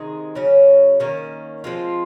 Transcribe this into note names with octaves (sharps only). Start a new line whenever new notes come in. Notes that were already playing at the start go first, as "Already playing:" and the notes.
Already playing: C3 D#3 G#3 D#4 G#4
C#3 F#3 C#4
D#3 A#3 C#4
F3 G#3 C4 F4